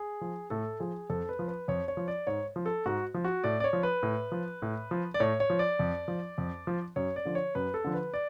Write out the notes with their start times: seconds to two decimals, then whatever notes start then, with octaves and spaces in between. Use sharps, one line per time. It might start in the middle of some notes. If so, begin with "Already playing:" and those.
Already playing: G#4
0.21 F3
0.50 A2 A4
0.80 F3 G#4
1.10 F2 A4
1.29 B4
1.39 F3
1.48 B4
1.68 F2 C#5
1.88 C#5
1.97 F3
2.08 D5
2.27 G#2 C#5
2.56 F3
2.66 A4
2.86 G#2 F#4
3.14 F3
3.25 F#4
3.44 A2 D5
3.60 D5
3.64 C#5
3.73 F3
3.83 B4
4.03 A2
4.32 F3
4.62 A2
4.91 F3
5.14 D5
5.20 A2 C#5
5.40 C#5
5.50 F3
5.59 D5
5.79 F2
6.08 F3
6.38 F2
6.67 F3
6.96 F#2 C#5
7.16 D5
7.25 D3 F3
7.35 C#5
7.55 F#2 B4
7.74 A4
7.84 D3 F3
7.93 B4
8.14 D5